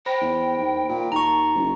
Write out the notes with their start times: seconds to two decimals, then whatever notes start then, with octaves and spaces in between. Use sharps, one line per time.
0.06 C5 G5 B5 A#6
0.21 E2
0.59 D#2
0.89 A#2
1.12 D#2 A5 A#5 C#6
1.55 F#1